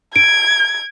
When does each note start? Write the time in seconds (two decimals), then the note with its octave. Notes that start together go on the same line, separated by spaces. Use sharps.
0.16 G#6 D7